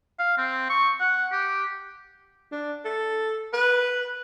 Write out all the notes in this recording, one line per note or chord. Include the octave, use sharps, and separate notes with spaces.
F5
C4
C#6
F#5
G4
D4
A4
B4